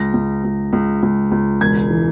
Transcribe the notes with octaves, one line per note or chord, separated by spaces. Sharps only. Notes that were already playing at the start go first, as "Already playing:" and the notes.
Already playing: C#2 A#6
C#2
C#2
C#2
C#2
C#2
E1 G#6
E3